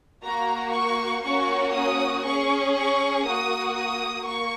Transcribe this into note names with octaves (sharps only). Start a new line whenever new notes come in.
A#3 F#4 A#5
C#6
A#3 C#4 F#4 C#6
D#6
C#4 G#4 C#6
C#6
A#3 F#4 D#6
D#6
A#3 C#6